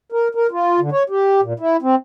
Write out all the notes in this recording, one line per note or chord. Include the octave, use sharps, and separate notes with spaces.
A#4
A#4
F4
D3
C#5
G4
A#2
E4
C4